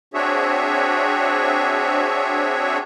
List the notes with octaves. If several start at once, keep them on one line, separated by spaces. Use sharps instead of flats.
C4 D4 F#4 G#4 C#5 E5